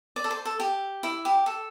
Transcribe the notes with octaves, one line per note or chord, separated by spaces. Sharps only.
D5
A4
C5
A4
G4
E4
G4
A4